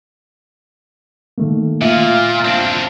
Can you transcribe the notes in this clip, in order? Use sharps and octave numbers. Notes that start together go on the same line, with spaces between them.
D#3 A3 A#3
A#2 F4 E5
C4 D4